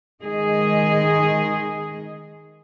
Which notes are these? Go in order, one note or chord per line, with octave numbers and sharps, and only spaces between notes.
D#3 G#3 G#4 D#5